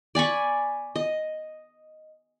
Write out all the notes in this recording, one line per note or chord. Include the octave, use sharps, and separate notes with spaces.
D5 G#5 B5 C#6
D#5